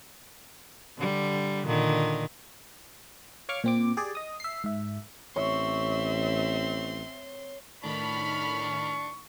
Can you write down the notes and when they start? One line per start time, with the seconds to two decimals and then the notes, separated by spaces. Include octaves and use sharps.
0.97 D3 G3
1.65 A#2 D3 D#3
3.49 C#5 F5 C#6 D6 F6
3.64 A#2 C4 D6
3.97 G4 G#4 D5
4.15 D#5 D#6
4.40 E5 C7
4.64 G#2 E5
5.36 A1 C4 C#5 E5 C6
7.84 A2 D#3 D4 A5 B5 C#6 F6